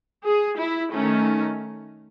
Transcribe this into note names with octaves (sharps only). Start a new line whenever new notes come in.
G#4
E4
D#3 A3 C#4